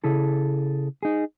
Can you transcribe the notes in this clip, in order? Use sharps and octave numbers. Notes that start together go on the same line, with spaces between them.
C#3 E4 G#4 A4
D#4 G#4